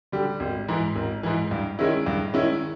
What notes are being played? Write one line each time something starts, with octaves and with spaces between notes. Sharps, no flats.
D3 G3
G#1
G#2 E3
G#1
G#2 E3
G2
D#3 G#3 C#4 E4
G2
D#3 G#3 C#4 E4